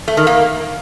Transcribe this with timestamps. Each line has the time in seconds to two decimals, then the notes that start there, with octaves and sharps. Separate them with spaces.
0.08 A3
0.17 D#3
0.27 A#3